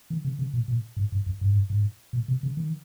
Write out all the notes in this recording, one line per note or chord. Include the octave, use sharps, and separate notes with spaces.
D#3
C#3
C#3
A#2
A#2
G#2
G2
F2
G2
G#2
G2
G#2
A#2
C3
C#3
D#3